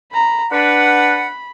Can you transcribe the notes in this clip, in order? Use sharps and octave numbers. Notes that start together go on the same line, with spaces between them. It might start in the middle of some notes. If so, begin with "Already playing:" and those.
A#5 B5
D4 B4 F#5 B5